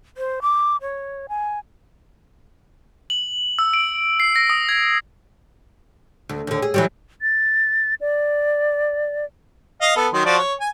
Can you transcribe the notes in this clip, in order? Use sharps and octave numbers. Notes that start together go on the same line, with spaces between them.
C5
D6
C#5
G#5
F#7
E6
D7
C7
A#6
D#6
G#6
D2
D#2 D3
G#4
E3 F#3 G3
A6
D5
D#5 F5
B3 A4
D#3 F#3 C6
F3 F#4 D5
C#5
G#5